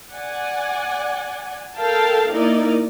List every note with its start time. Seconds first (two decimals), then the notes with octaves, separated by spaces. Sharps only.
0.12 D5 F#5 G#5
1.75 A4 A#4 F5 G5 A5
2.29 A#3 D#4 E4 A#4 D5 D#5